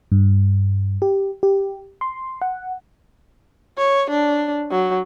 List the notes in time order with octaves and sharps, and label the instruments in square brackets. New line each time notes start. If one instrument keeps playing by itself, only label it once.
[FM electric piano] G2
G4
G4
C6
F#5
[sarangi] C#5
D4
F#3